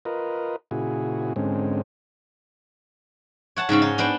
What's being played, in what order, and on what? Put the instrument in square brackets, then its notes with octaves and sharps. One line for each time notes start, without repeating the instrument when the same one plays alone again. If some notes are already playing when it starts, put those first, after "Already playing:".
[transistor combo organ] F4 A#4 B4 D#5
A#2 C#3 E4 F#4 G#4
G#2 D3 G#3 C4 C#4
[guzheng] C#5 F#5 A5
G#2 C#3 C4 C#4
D#4
B3 D4 C5 G5